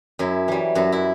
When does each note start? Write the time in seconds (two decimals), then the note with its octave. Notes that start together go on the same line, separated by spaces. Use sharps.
0.19 F#2 E4
0.48 E3 G3
0.75 F#2 F#4
0.92 E4